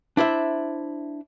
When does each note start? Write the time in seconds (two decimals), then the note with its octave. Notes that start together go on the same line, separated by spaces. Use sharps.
0.17 D4 E4 C5 E5